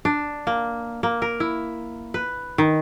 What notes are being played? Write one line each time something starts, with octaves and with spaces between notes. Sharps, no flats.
D4
A#3
A#3
A#4
E4
B4
D#3